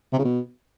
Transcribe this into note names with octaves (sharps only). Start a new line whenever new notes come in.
C3
C#3
B2